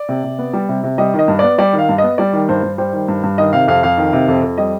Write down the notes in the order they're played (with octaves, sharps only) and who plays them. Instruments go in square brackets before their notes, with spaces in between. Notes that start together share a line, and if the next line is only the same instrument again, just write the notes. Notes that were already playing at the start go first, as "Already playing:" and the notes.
Already playing: [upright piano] D5
C3
C3
B3
G3
C3
C3
G3 D#5
D#3
D#5
G2
B3 D5
G3 D5
D#3
F5
G2
B3 D#5
G3 D5
D#3
G2 C5
G2
G3 C5
D#3
G2
G2
D#3 D#5
C3 F5
F2 F5
F2 F5
D#3
C3
F2
F2
G3 D#5